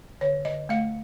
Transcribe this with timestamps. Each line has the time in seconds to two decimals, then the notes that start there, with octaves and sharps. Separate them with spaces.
0.21 D3 C#5
0.45 D3 D#5
0.69 A3 F5